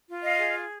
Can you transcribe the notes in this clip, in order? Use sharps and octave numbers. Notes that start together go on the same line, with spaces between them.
F4
D#5 F5
G#4